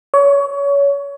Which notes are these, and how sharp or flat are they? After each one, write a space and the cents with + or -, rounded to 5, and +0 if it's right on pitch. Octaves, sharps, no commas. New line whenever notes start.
C#5 +25